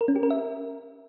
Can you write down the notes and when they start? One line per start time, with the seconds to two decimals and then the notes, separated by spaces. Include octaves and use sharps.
0.01 A#4
0.08 C#4
0.16 G4
0.23 A#4
0.30 E5